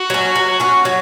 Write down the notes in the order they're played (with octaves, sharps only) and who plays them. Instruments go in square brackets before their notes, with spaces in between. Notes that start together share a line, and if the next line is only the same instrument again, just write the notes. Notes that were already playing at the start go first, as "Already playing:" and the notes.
Already playing: [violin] F#4
[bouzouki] F#3 C#4
F#3
C#4 F#4
F#3